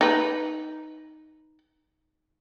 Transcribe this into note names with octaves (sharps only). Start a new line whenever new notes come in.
D#4 B4